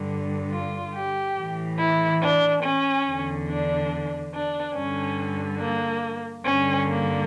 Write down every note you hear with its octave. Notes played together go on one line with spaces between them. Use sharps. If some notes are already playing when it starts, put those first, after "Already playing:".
Already playing: G2 D3
F4
G4
A2 E3
E4
D4
C#4
E2 D3
D4
D4
G2 D3 C#4
A#3
G2 D3 C#4
A#3